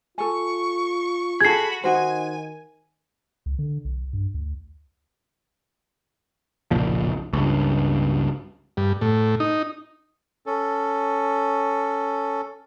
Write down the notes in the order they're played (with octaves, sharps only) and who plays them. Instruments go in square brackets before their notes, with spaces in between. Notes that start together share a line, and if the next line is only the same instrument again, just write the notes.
[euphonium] F4 [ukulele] A4 G#5 [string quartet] C#6
[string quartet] F#4 B5 [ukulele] G#4 A4 [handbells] G#6 C7
[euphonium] D#3 [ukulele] D#4 F#4 C5 [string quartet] G#5
[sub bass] C#2
D3
B1
G2
D2
[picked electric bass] F#1 B1 A#2 F3
C#2 G2
[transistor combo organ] G2
A2
D#4
[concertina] C#4 A4